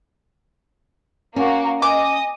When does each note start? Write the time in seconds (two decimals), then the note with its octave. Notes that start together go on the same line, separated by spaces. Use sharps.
1.36 A#3 C#4 F#4
1.82 D#5 G#5 D6 D#6